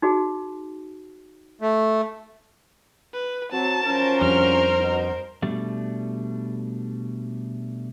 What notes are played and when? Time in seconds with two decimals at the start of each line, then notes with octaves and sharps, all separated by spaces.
0.02 D#4 F#4 G#4
1.61 A3
3.13 B4
3.52 F#3 C4 A5
3.86 F3 F#3 C#4 A#4 C5
4.21 F2 G3 D4 F6
4.78 B2 D#4
5.42 B2 G3 A3 D4